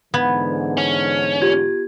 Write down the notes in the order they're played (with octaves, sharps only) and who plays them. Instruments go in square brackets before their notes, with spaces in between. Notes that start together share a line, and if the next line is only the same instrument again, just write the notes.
[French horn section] G#2 D3 E3 [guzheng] B3 [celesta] G#6
[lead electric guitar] C#4
[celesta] F4 G4 G#6